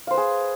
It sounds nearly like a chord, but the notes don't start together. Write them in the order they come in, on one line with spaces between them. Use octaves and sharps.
F5 C5 B4 G#4